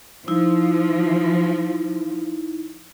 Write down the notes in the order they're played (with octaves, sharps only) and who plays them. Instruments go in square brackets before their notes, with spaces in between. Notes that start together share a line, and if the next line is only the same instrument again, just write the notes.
[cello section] F3 [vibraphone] D#4 E4